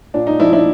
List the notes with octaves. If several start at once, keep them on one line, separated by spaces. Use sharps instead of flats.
A#2 D4
D#4
F3 D4 E4
D4 E4